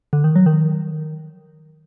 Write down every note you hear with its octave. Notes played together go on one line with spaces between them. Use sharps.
D3
D#3
F#3
D#3